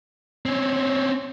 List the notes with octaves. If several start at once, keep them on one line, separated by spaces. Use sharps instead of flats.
C4 C#4